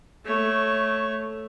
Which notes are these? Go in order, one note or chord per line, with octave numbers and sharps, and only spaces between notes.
A3 C#5